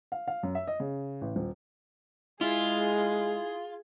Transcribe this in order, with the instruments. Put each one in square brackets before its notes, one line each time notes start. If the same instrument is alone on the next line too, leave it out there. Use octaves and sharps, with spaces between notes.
[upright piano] F5
F5
F#2
E5
D#5
C#3
A1
D#1
[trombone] G#3 [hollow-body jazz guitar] E4 [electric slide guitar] F4 [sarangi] G#4